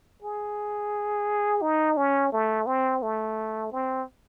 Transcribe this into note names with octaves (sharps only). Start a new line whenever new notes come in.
G#4
D#4
C#4
A3
C4
A3
C4